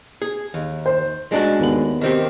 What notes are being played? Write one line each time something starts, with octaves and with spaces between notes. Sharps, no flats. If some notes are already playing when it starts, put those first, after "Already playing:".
G#4
D#2
C5
G#3 D4 F#4
D#2 B3 F#7
D#3 C4 G4